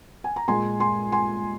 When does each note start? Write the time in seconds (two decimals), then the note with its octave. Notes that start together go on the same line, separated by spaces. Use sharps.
0.24 G#5
0.36 A#5
0.48 A#2 G#3 G#5 C6
0.80 G#5 C6
1.12 G#5 C6